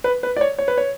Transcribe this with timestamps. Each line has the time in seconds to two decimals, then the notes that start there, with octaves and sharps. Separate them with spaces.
0.04 B4
0.23 B4
0.36 D5
0.41 C#5
0.58 C#5
0.68 B4
0.78 C#5